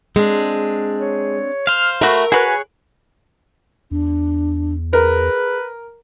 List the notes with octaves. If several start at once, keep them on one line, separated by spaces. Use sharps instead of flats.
G#3 C4 D4
C#5
C5 F5 F6
A3 F#4 A#4 B5
F#4 G#4 B4 C#5 G#5 F#6
E2 D4
G#4 A#4 B4